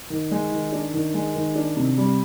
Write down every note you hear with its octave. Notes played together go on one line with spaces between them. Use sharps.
D#3
G#3
D#3
D4
D#3
G#3
D#3
D4
C3
G3